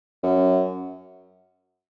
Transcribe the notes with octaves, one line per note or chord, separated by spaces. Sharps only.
F#2